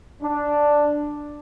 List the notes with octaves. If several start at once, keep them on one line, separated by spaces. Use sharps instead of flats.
D4